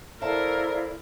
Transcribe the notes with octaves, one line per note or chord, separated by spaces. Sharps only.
E4 A4 A#4 C5 D5 E5 F5 A5